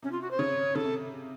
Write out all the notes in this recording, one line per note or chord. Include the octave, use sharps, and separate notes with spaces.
C3 C#4
F4
F#4
C5
C#3 C#5
C#3 A4
C3